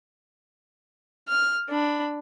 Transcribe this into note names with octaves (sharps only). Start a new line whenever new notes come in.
F6
D4 B5